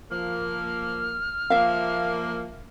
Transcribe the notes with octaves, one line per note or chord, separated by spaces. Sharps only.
F3 A#3 F6
F3 A#3 E5 F5